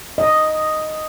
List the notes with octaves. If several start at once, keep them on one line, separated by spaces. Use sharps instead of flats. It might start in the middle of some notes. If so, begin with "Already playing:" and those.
D#5